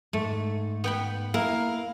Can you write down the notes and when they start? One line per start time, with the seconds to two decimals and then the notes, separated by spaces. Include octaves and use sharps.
0.13 G#2 A3
0.84 B3 G5 B5
1.34 A#3 E4 A#4 F5